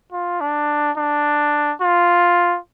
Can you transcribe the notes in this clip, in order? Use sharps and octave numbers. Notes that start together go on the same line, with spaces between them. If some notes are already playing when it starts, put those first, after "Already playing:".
F4
D4
D4
F4